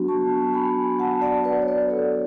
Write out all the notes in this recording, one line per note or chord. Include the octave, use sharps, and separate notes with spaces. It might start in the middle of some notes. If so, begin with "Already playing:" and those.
Already playing: F#3 B3 D4 F#4
A5 C#6
G#5 B5
F#5 A5
D5 F#5
B4 D5
C#5
B4 D5
A4 C#5